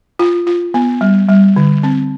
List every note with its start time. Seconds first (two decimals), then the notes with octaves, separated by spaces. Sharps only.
0.19 F4
0.47 F4
0.74 B3
1.01 G3
1.29 G3
1.56 D3
1.83 C4